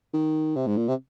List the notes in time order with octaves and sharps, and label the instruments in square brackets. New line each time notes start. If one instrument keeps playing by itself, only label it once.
[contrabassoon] D#3
C3
G#2
A#2
C3